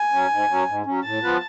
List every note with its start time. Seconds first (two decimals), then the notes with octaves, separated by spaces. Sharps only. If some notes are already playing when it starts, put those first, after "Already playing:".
Already playing: G#5
0.12 F#3 C#4
0.30 G#2
0.49 F#3 C#4
0.68 G#2
0.86 F#3 C#4
1.04 A2 A5
1.22 F3 B3 F4 B4